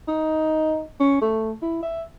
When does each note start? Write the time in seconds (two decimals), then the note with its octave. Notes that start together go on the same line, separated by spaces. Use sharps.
0.08 D#4
1.00 C#4
1.22 A3
1.62 E4
1.83 E5